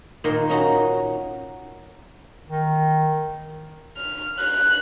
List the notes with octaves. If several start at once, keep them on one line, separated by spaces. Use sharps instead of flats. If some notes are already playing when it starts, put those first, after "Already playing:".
A#2 D#3 F4 D#5 C6
C#4 D#4 F#4
D#3
F6
F#6